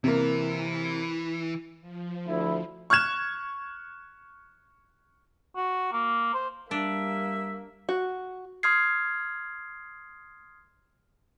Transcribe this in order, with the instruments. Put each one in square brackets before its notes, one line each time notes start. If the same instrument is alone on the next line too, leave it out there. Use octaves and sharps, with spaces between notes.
[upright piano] C3 A#3 [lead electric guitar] E3
[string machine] F3
[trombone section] D2 E4
[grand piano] C#6 F6 F#6 G#6 E7
[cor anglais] F#4
A#3
C5
[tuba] G3 [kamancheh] A#3 [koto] D4 [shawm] E5
[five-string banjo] F#4
[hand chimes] C6 D#6 F6 G#6 C7